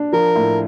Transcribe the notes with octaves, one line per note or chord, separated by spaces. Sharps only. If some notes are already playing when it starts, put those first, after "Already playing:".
Already playing: D4
F3 A#4
A2